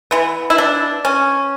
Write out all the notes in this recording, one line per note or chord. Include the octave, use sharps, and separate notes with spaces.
E3 B3
E4
D4
C#4